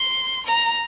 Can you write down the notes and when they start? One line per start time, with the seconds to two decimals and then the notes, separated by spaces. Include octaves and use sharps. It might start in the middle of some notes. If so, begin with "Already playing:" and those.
Already playing: C6
0.45 A#5